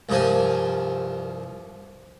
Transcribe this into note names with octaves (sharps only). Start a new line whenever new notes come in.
C2 G2 F3 A#4 C5 G#5